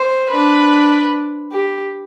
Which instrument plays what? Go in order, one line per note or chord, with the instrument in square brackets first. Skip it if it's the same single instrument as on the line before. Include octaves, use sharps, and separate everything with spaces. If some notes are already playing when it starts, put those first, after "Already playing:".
Already playing: [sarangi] C5
[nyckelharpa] D4 [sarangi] B4
[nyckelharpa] G4